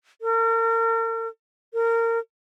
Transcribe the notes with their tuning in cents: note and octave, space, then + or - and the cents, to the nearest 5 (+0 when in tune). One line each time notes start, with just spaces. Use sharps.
A#4 -40
A#4 -25